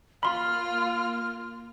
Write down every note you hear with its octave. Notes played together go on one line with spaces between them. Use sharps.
A#3 F4 B5 C6 F6